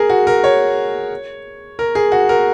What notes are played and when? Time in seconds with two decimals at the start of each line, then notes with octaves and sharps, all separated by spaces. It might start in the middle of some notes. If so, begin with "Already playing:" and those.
Already playing: G#4 A#4
0.09 F#4
0.27 A#4
0.44 C#5
1.79 A#4
1.95 G#4
2.12 F#4
2.29 A#4